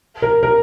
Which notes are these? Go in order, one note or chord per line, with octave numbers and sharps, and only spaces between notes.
A#4
A#4